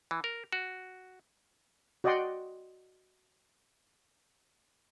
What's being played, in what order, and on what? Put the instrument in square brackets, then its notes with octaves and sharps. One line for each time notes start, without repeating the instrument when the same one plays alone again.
[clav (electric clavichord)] E3
A#4
F#4
[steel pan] F#4 D5 D#5 F#5 G5 C6